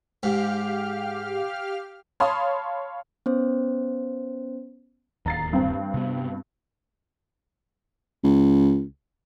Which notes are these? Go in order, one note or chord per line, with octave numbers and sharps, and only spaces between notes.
G#2 G4 F5 F6
C#5 F5 A5 B5 C6 D#6
B3 C#4 C5
D1 D#2 A#5 A6 C7
G2 C4
C3 B3
C#2